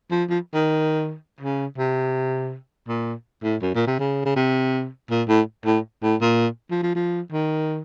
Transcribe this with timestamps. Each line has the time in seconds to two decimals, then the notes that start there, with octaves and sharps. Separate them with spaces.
0.11 F3
0.30 F3
0.54 D#3
1.40 C#3
1.78 C3
2.88 A#2
3.44 A2
3.62 F#2
3.75 A#2
3.87 C3
3.99 C#3
4.25 C#3
4.36 C3
5.10 A#2
5.28 A2
5.66 A2
6.03 A2
6.21 A#2
6.71 F3
6.83 F3
6.95 F3
7.32 D#3